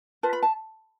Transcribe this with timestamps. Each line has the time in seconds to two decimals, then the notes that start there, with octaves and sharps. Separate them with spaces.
0.23 F4 B4 A5
0.33 B5
0.43 A5